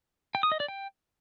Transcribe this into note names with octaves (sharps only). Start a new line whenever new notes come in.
G5
D#6
D#5
D5
G5